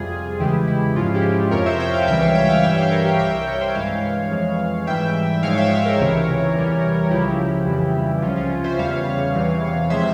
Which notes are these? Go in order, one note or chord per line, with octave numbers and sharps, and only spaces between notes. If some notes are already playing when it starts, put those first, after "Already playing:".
Already playing: F2 C3 G3 F4 G#4
E2 C#3 E3 G#3 E4 G4
E4
G#2 F3 G#3 C#4 F4
E4 G4
F2 C3 F3 A#4 C#5
C5 E5
E5 G5
C#5 F5
C#2 C#3 E3 G3 E5 G5
C#5 F5
E5 G5
C#5 F5
G2 E3 G3 E5 G5
C#5 F5
A#4 C#5
G4 A#4
C2 C3 G3 E5 G5
A#4 C#5
C5 E5
G2 E3 G#3 C#5 F5
F2 E3 G#3
G#2 E3 G3 E5 G5
G#2 F3 G#3 C#5 F5
E5 G5
C#5 F5
A#4 C#5
C#2 C3 E3
E2 E3 G3
C#2 C#3 F3 E4 G4
F2 C#3 E3 G3
C#2 C3 F3 C#4 F4
C#4 F4
C5 E5
E2 C#3 G3 C#5 F5
E2 C3 E3
C3 F3 G#3 C5 E5